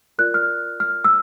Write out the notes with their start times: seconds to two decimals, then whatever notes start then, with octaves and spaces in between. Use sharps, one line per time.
0.18 F4 A#4 D5 F#6
0.34 F6
0.80 F6
1.05 E6